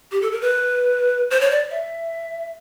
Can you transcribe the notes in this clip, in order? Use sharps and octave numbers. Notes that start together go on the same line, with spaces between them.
G4
A4
A#4
B4
C5
C#5
D5
E5